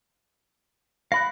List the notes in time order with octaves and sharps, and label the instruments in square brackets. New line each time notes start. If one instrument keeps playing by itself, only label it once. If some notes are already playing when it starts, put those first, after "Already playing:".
[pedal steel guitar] F5 B5 F#6 [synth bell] A#6